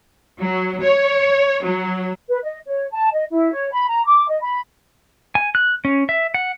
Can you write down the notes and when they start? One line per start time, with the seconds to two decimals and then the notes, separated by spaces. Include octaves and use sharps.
0.41 F#3
0.82 C#5
1.63 F#3
2.29 B4
2.43 D#5
2.66 C#5
2.91 A5
3.13 D#5
3.30 E4
3.52 C#5
3.71 B5
3.88 A#5
4.04 D6
4.28 D#5
4.41 B5
5.35 G#5
5.55 F#6
5.85 C#4
6.09 E5
6.34 F#5